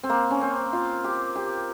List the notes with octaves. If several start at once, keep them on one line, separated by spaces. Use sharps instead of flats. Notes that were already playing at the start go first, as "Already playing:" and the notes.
C4
A#3
C#4
C4
F4
G4
G4